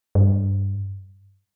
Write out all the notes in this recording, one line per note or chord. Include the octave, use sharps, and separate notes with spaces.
G2